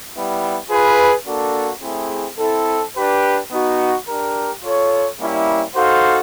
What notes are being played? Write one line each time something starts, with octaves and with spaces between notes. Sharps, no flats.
G3 B3 E4
F4 G#4 B4
A#3 D4 F#4 A4
A3 C4 E4 G#4
C4 E4 A4
D4 G4 B4
B3 D#4 F#4
D4 G4 A#4
F4 A4 C#5
G3 A#3 C#4 E4
D#4 F#4 A4 C5 F5